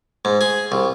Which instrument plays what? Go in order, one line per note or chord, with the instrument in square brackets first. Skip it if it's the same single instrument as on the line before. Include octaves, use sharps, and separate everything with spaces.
[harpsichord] G#2
G#4
C2